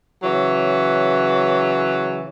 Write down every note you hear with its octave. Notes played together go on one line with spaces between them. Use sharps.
C#3 E3 F#3